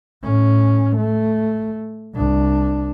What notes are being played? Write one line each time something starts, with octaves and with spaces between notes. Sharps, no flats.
A2 C#4
A3
C2 D4